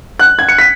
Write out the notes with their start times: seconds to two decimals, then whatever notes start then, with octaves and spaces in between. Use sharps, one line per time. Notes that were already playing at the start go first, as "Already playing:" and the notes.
0.19 F#6
0.39 G#6
0.49 C#7
0.59 B6